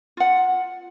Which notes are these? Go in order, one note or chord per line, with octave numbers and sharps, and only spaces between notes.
F4 F#5